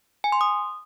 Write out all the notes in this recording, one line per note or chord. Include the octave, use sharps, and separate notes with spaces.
G#5
C6
D#6